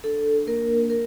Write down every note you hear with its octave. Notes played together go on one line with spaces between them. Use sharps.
D4 A4
A#3 A#4
A#3 A#4